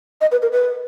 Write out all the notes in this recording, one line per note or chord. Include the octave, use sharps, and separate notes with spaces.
D#5
B4
A#4
B4